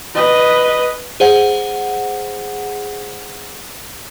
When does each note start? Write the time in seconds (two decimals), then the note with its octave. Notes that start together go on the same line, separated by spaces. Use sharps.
0.15 B4 D#5
1.20 G#4 C5 F#5